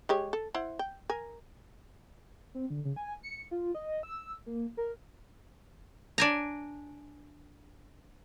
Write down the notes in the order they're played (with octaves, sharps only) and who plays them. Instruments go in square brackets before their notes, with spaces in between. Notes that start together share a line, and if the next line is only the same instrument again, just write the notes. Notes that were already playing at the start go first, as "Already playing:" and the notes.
[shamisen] G#3 G4 C#5
A4
E4 C5 F#5
G5
A#4 G#5
[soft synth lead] C4
D3
C#3
G#5
C#7
F4
D#5
E6
A#3
A#4
[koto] D4 G#5 A#5